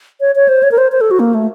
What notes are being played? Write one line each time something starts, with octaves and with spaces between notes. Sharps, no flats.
C#5
C#5
C5
C#5
A#4
C5
C5
A4
F#4
A#3
A3